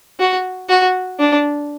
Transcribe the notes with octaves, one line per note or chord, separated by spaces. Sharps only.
F#4
F#4
D4